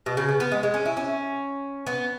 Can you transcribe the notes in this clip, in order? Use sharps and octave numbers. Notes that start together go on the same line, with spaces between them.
B2
C#3
B3
B3
G#3
G#3
C#4
E4
C#4
B3